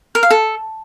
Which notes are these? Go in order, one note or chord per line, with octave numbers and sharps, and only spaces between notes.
A#4
F5
A4